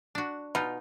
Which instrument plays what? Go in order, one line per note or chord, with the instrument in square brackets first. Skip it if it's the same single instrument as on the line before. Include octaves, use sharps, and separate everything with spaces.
[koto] D4 F#4
[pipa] B2 [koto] D#4 F4